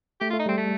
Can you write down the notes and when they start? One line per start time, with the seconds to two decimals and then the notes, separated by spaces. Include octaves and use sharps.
0.21 A3 G4
0.30 F4
0.33 A3
0.40 D#4
0.46 G3 C4
0.58 A3